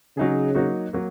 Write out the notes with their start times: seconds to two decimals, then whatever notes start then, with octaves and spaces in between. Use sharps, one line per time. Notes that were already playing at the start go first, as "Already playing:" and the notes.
0.17 C#3 F#3 D#4 G#4
0.55 F#3 A#3 D#4 F#4
0.93 F#3 A#3